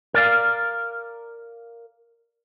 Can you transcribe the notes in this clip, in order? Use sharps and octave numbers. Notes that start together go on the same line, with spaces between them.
A#4 D5 F5